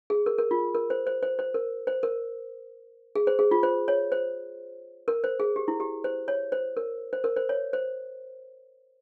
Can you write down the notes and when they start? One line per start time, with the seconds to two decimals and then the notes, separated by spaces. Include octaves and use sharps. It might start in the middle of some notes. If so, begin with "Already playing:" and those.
0.10 G#4
0.26 A#4
0.38 A#4
0.51 F4
0.74 A#4
0.90 C5
1.07 C5
1.23 C5
1.39 C5
1.54 A#4
1.87 C5
2.03 A#4
3.15 G#4
3.27 C5
3.39 G#4
3.51 F4
3.63 C5
3.88 C#5
4.12 C5
5.08 A#4
5.24 C5
5.40 G#4
5.56 G4
5.68 E4
5.80 G4
6.04 C5
6.28 C#5
6.52 C5
6.77 A#4
7.13 C5
7.24 A#4
7.36 C5
7.49 C#5
7.73 C5